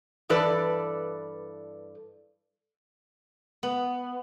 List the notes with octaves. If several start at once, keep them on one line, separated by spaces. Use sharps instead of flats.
G2 E3 A4 B4 D5
B3